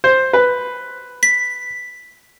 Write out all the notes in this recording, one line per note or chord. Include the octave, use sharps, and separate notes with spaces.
C5
B4
B6